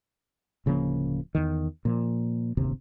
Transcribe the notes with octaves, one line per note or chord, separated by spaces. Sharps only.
D1 C#3 F3 A#3
E2 D#3
A#2 F3
D1 G1 D#2 C3